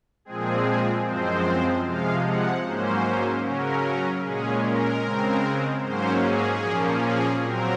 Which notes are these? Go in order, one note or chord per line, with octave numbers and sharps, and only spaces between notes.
A#2 F3 G#3 C4 G#4
F#2 F3 G#3 C4 C5
C3 F3 G#3 F5
F#5
G#2 F#3 A#3 C#4 C5
C#3 F#3 C#4 A#4
A#2 G#3 C#4 G#4
A#4
C#3 G#3 C4
G#2 F#3 A#3 C#4 C5
G#4
A#2 F3 A#3 C#4
G#4
A#2 F#3 C4 A#4